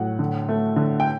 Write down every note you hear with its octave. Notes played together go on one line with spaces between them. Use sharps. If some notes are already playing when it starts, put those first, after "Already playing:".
Already playing: A2 F#3 F#5
D3
A3
D3
G5